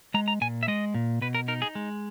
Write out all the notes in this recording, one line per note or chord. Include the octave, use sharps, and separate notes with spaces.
G#3 A#5
A#5
A#2 G#5
E5
G#3 D#5
A#2
B2 B4
A#4
D#4 A#4
G#4
G#3